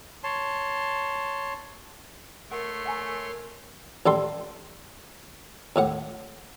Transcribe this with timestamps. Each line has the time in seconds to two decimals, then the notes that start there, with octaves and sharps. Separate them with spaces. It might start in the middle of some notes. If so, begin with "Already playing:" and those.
0.24 C#5 A5 C6
2.51 A3 A#4 C#5 F#5 C6
2.86 F#5 G#5 A#5
4.06 A1 G3 A4 C6
5.76 D#2 A2 F#5